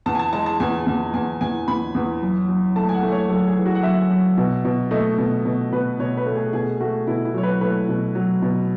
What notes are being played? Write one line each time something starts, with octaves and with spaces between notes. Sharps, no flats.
E2 A5
G#5
A5
G#3 A5
A5
E2 G#5
E2
E2 G#5
E2 G#5
E2 B5
E2
F#2
F#2
A3 A5
G#5
F#5
A3
C#5
F#2 A4
G#4
E3
F#4
F#5
F#2 E5
F#2
B2
B2
A3 D#5
B2
B2
B2 B4
B2 C#5
B4
A3
G#4
B2 G#4
A3 F#4
B2 E4
E4
F#3 C#5
B4
A3 B4
B2
F#3
B2